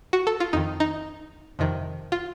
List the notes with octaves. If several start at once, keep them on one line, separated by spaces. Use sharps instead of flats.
F#4
A4
F4
F2 D#3 D#4
D#4
F2 C3 D#3
F4